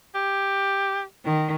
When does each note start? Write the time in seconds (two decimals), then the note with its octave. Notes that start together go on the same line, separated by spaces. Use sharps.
0.15 G4
1.24 D#3